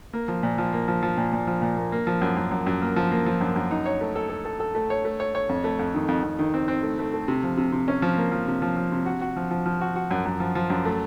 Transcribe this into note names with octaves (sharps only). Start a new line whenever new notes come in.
A#3
F3
A#2
F3
A#3
F3
F3
A#2
A#2
F3
A#2
A#3
A#3
F3
F#2
F#2
F#2
F#2
A#3
F3
A#3
F3
F#2
F#2
D#4
C#5
A3
A4
A4
A4
A4
A3
C#5
A3
C#5
C#5
F2
A3
F2
D#3
F2
F2
D#3
C4
C4
A3
A3
A3
C3
F3
C3
C3
C#4
F3
A#3
F3
C3
F3
F3
C3
F#4
F#4
F3
F3
F3
F#4
F#4
F#2
F#2
F3
F3
F#2
A3